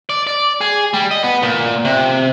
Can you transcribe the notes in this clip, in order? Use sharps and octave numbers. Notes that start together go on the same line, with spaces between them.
D5
D5
G#4
G3
D#5
B3
A#2
C3